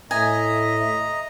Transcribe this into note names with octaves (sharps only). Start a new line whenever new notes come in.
A2 D#5 E5 G#5 A#5